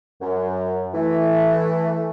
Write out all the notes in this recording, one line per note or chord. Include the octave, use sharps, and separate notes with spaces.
F#2
E3 A3